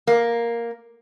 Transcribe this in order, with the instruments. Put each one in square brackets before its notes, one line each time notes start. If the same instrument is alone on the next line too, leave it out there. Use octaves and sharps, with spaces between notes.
[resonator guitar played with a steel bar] A#3